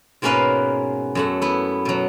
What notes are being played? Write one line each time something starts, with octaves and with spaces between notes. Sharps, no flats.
G#2 B2 A#3 C#4 B4 F5
F#2 A3 F#5
B3 E4
B2 F#3